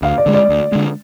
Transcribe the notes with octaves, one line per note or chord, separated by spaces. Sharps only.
D2 F5
D5
D3 G#3
D5
D2
D3 G#3